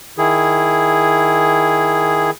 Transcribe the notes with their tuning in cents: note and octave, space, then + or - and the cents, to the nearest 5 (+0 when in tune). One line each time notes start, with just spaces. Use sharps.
D#3 +0 E4 +0 G#4 +0